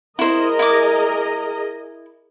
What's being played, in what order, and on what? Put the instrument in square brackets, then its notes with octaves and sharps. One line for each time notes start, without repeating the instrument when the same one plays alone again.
[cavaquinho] E4 C5 [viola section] G#4 A#4 D#5
[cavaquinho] E4 D6